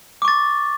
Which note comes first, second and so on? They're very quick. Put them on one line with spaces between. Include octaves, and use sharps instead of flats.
D6 C#6 A6